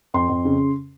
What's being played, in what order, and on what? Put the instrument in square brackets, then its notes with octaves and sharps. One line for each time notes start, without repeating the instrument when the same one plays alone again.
[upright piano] F2 C6
F2
C#3